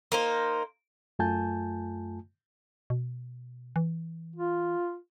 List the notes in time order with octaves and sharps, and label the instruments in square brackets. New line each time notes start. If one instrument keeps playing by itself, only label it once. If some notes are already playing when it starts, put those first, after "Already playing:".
[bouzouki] A#3 D#4 C5
[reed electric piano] F#2 A3 F4 G#5 A5 G6
[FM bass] B2
E3
[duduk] F4